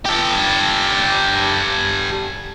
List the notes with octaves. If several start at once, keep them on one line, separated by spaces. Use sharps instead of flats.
G4 A4